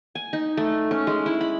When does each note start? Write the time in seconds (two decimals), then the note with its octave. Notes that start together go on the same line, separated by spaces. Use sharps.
0.15 G#5
0.33 D#4
0.57 A3
0.91 C#4
1.07 G#3
1.26 E4
1.41 B5